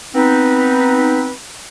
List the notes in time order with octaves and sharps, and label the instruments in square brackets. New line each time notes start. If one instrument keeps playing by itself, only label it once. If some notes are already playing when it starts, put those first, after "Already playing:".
[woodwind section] B3 C4 D#4 B4